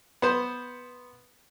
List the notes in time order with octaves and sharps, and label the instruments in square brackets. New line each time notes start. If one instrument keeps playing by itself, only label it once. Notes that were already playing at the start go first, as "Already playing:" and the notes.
[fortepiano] B3 C5